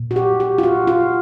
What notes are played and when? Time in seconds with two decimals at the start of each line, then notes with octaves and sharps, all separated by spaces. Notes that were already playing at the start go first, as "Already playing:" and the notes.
Already playing: A#2
0.11 F#4
0.16 G4
0.40 G4
0.58 F4
0.63 F#4
0.87 F4